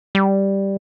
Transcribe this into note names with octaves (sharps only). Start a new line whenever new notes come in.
G3